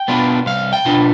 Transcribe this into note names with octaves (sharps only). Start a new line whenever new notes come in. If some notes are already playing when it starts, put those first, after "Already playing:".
Already playing: G5
B2 B3 D4 F4
C2 F5
G5
B2 B3 D4 F4